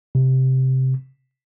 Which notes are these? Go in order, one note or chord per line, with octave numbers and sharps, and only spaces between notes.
C3